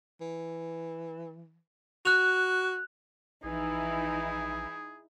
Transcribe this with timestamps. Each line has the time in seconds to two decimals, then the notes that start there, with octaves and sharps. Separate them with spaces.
0.21 E3
2.05 F#4 F#6 F7
3.44 A#1 E3 D#4 E4 G#4